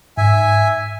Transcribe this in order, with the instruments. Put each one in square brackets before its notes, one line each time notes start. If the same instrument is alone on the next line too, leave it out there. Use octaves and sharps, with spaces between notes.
[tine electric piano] G#2 [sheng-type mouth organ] E5 G#5